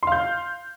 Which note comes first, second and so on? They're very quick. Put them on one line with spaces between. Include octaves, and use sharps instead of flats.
C6 F5 G6